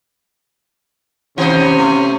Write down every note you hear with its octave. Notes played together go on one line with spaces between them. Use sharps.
C3 D#3 C#4 C5
A3